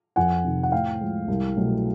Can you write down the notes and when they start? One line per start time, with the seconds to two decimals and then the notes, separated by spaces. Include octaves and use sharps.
0.16 F2 F#5 G#5
0.44 C3 D#3
0.63 F#5
0.72 A2 F5 G5
1.01 F3 G#3
1.28 C2
1.57 B2 F#3 A3